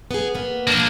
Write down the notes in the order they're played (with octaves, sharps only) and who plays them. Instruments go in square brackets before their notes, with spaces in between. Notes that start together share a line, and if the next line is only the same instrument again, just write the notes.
[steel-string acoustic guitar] B3 G#4
A#3 B3
[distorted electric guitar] A#3 D4